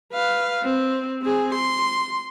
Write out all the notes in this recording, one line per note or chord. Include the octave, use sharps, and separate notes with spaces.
B4 F5
C4
C4 G#4
C6